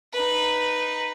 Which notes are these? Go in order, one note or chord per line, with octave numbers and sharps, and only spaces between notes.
D#4 B4